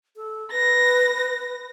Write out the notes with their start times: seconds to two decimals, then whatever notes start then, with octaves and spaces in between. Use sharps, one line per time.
0.16 A4
0.51 B4 A#6